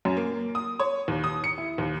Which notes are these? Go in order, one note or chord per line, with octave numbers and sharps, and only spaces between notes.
F#2
A#3
D#6
C#5
D#2
D#6
C#7
E4
D#2